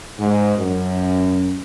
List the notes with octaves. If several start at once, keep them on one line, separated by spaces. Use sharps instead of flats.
G#2
F#2